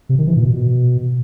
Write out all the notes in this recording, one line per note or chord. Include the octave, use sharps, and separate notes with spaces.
C3
D#3
E3
A#2
B2